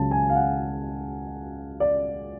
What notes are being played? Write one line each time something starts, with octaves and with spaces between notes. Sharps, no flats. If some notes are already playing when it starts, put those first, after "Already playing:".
Already playing: C#2 C#3 F#3 C#4 A5
G#5
F5
F#5
D5